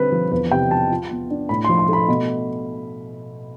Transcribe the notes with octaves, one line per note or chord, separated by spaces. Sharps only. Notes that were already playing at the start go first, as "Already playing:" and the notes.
Already playing: D3 G3 C4 B4
F3
E2 B4
C3 G5
F3 A5
F4
B3
D4
A2 B5
C6
F3
C6
A3 B5
B2